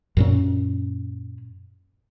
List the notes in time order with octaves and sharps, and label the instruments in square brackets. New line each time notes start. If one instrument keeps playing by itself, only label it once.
[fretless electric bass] F#2 A#2 C#4